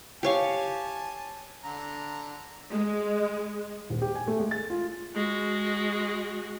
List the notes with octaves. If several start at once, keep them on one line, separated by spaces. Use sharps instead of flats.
G4 C#5 F5 G#5 A5
D3 A#5
G#3
D#1
G4
G#5
A3
G#3
A6
F4
G#3 F#4